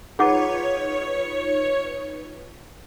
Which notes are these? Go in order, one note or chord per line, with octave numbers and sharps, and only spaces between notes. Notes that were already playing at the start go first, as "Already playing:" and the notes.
D#4 F4 G#4 B4 C#5 F#5 D6